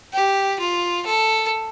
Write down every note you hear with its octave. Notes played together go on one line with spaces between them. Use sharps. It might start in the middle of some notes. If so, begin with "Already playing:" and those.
G4
F4
A4